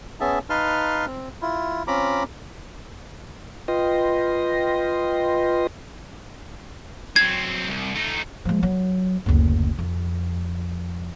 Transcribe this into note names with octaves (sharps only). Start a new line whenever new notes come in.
B3 C#4 G#4 E5 A5
D#4 B4 F5 A5 C6 F6
C4
E4 F4
C4 C#4 F4 A#5 B5 D6
F4 B4 D#5 G5 C6 A#6
F#3 C4 G#6
C2
A3 D#4
F3 G#3
F#3
F#1 D2
F2